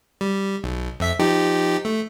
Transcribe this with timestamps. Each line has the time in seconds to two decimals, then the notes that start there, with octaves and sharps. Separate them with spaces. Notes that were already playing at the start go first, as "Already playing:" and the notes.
0.21 G3
0.64 B1
1.00 F2 E5 B6
1.19 F3 D#4 G4
1.85 A3